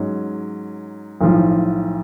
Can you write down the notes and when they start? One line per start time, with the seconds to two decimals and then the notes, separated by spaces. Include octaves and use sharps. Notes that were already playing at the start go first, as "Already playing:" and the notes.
Already playing: G#2 F#3 C#4
1.21 B1 A2 F3